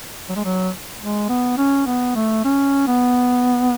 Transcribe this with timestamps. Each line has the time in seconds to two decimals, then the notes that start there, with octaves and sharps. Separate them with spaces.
0.29 F#3
0.36 G#3
0.45 F#3
1.01 G#3
1.29 B3
1.57 C#4
1.86 B3
2.15 A3
2.44 C#4
2.87 B3